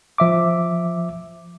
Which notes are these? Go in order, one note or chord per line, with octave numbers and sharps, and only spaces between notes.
F3 E5 D6